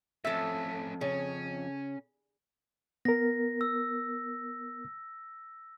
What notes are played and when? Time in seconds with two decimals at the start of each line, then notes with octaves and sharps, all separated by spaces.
0.25 F2 A3 C#4 A4 E5
1.01 C#3 C#4
3.05 B3 A#4 A#6
3.61 E6